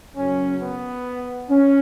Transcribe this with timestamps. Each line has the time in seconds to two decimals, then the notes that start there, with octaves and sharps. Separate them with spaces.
0.16 F#1 F#2 F#3 C#4
0.62 B3
1.50 C#4